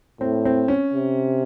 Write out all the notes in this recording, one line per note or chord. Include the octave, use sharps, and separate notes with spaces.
A2 C4
C4
C#4
C3